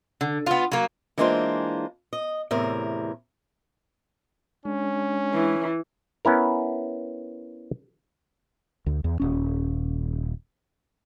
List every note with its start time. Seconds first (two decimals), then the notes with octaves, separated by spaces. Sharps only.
0.21 D3
0.46 B3 F4
0.72 F#3 A#3
1.18 E3 G#3 A#3 D4 F4 C5
2.13 D#5
2.51 E2 A2 C3 A#4
4.65 G#3 C#4 D4
5.34 E3
6.25 B3 C#4 E4 A#4
8.86 D2
9.04 E2
9.20 D#1 C#4